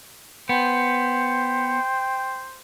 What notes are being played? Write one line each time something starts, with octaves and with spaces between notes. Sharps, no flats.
B3 C5 G5